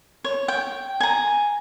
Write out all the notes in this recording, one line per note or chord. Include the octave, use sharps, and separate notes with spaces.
C#5
G5
G#5 A#5